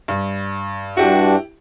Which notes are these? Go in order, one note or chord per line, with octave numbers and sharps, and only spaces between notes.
G2
G2 D4 E4 F#4 G4